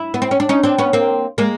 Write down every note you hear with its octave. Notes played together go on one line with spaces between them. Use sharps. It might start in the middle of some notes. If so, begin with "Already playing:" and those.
Already playing: E4
B3
C4
C#4
D4
C#4 D#4
C4 D4
B3 C#4
A#3 C4
G#3 A#3